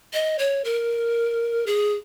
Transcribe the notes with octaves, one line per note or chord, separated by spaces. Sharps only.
D#5
C#5
A#4
G#4